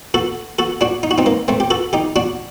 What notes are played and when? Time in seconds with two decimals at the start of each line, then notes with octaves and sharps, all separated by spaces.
0.14 F#4 A4
0.59 F#4 A4
0.81 D4 F#4
1.03 D#4
1.11 F#4
1.18 C4 D#4
1.26 A#3
1.48 A3 C4
1.60 G4
1.70 F#4 A4
1.93 D#4 G4
2.16 D4 F#4